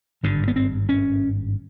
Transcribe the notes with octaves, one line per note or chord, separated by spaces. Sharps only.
G#1 G2 D3
B3
C4
C#4